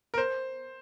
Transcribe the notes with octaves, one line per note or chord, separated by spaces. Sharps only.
A#4
C5